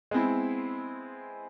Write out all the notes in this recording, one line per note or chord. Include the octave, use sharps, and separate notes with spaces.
G#3 B3 C4 E4